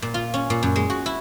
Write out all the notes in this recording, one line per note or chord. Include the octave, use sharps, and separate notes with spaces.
A#2
F4
C#4
A#2
F#2
G#3
F#4
E4